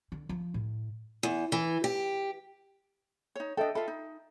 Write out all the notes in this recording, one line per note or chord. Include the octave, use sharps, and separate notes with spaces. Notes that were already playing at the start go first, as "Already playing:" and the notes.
D3
F3
A2
E2
E3
G4
D#4 C#5
D4 A4 D#5 E5 G5
F4 A4 E5 B5
D#4